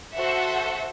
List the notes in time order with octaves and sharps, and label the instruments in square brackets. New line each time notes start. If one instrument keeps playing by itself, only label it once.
[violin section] F#4 A4 C5 E5 F#5